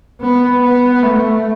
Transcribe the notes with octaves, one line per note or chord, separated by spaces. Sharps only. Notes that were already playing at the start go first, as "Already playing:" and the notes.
B3
B3
A3